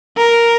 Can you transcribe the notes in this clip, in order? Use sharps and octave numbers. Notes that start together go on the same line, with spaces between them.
A#4